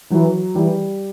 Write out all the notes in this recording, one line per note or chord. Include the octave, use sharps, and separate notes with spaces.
E3 F#3
E3 G3